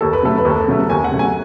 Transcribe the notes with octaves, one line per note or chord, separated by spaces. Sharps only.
D#2 A4
B4
C#3 F#3 A3 A4
B4
D#2 A4
C#3 F#3 A3
D#2 G#5
F#5
C#3 F#3 A3
G#5